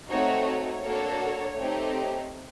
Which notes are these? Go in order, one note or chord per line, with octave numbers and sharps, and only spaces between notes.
A3 C4 D#4 F#4 C#5
C#5
A#3 D4 F#4 A4
A3 C4 D#4 G4